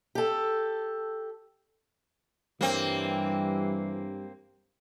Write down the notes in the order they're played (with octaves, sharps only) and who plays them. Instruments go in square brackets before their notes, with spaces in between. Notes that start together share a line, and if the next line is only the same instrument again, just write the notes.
[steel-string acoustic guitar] G4 A4
[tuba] G2 [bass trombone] E3 [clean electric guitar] G3 C5 C#5 [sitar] A#3 C4